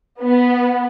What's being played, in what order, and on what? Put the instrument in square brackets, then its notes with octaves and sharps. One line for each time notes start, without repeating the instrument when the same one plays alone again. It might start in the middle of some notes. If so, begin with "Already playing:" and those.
[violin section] B3